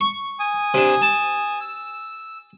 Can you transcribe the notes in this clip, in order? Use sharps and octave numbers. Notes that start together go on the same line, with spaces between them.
C#6
G#5 D#6
C3 D4
A5
E6